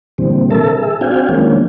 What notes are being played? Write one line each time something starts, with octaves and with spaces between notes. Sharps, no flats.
A#2 D3 E3 G3 C4
A4 A#4 E5 A5
G#4 E5
C4 D4 F#4 F5 G5 G#5
D#3 F3 G#3 A#3 C#4 D4